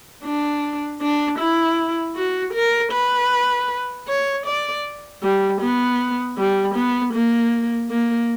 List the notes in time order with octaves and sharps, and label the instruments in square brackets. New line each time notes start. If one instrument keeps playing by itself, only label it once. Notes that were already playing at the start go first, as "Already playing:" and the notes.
[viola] D4
D4
E4
F#4
A#4
B4
C#5
D5
G3
B3
G3
B3
A#3
A#3